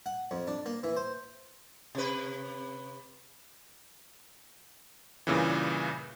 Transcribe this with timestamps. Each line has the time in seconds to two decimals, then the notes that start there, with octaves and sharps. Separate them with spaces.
0.06 F#5
0.31 F2
0.47 D4
0.66 A#3
0.83 E3
0.96 C5
1.95 C3 B4
5.27 G2 A#2 C#3 E3